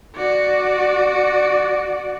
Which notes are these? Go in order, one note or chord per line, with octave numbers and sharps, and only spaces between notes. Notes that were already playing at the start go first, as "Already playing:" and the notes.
F#4 D5